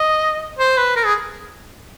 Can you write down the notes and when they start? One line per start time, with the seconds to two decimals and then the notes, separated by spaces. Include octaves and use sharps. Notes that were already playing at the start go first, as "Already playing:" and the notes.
Already playing: D#5
0.59 C5
0.77 B4
0.96 A#4
1.05 G#4